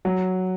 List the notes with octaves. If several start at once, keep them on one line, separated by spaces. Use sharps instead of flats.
F#3